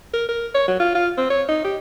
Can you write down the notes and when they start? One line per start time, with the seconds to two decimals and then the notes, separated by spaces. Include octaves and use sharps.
0.14 A#4
0.29 A#4
0.54 C#5
0.68 F#3
0.80 F4
0.95 F4
1.18 C4
1.30 C#5
1.48 D#4
1.64 G4